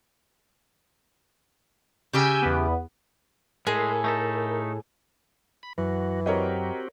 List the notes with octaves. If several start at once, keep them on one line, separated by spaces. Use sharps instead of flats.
C#3 G4 G5 G#5 E6 G6
E2 B3
A2 G#3 G#4 A#4
A3 D#4 A4
B5
F#2 E3 F#4
C4 F#4 G4 A#4 C#5 D#5